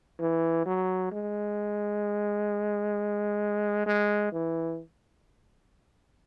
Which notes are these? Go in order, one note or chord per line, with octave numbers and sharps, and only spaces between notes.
E3
F#3
G#3
G#3
E3